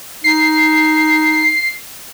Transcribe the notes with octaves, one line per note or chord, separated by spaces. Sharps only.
D#4 C7